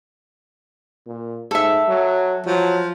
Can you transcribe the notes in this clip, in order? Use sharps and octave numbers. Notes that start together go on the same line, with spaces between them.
A#2
G#2 A4 E5
F#3
F3 F#3